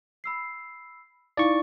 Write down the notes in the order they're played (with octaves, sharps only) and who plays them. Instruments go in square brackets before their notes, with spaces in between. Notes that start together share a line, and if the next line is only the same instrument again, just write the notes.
[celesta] B5 E6 C7
[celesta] D#4 E4 F5 [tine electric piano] D5 C#6